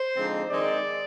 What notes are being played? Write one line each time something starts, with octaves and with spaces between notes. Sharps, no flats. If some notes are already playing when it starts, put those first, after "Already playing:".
Already playing: C5
D3 F3 G#3 C4 D#4
D#3 G#3 C4 D#4 D5